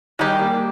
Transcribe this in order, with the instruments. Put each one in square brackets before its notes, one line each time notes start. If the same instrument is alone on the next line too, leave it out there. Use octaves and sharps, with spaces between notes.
[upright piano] D#3 G3 [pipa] G#3 D#4 G4
[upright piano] G3 A#3